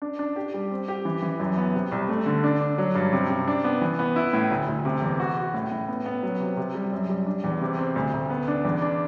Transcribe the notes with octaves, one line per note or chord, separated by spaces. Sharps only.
D4
D4
G4
G3
C4
G4
E3
E3
F#2
B3
C3
C2
A3
D3
D4
D4
F#3
G2
C3
C3
D4
B3
E3
B3
E4
A2
D2
D2
C3
E2
F#4
F#4
A2
A2
B3
B3
F#3
C3
C3
G3
F#2
G3
D4
E2
C3
C4
D2
D2
B3
D4
E2
D4